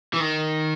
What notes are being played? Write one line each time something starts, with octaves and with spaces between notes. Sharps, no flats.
E3
D#3